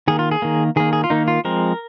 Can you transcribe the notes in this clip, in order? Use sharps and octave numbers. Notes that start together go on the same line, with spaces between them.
D#3 A#3 G#4
F4
G#4
D#3 A#3
D#3 A#3 G#4
G#4
F4
D#3 A#3 D#4
F4
F3 G#3 C4 A#4